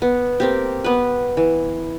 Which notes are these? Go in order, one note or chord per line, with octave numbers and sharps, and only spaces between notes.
B3
A#3 C4 G4
B3 B4
E3